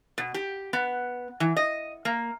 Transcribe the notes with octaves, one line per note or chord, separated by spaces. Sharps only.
B2
G4
B3
E3
D#5
A#3